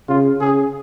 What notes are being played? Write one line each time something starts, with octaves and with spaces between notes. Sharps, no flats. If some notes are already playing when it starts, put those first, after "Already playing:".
C#3 F4
C#3 G#4